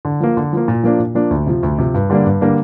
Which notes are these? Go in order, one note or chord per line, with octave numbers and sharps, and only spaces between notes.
D3
F3 A#3
D3
F3 A#3
A#2
F3 A#3 D4
A#2
F3 A#3 D4
D2
C3 F3
D2
C3 F3
G2
D3 G3 A#3 D4
G2
D3 G3 A#3 D4